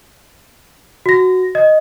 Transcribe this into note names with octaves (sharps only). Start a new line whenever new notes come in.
F#4 A#6
D#5